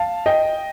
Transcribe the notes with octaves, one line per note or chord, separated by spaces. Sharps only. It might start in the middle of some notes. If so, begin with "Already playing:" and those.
Already playing: F5 A5
D#5 G5